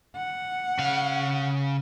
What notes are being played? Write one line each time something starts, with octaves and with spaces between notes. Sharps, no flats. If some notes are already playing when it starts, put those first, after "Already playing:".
F#5
C#3 F5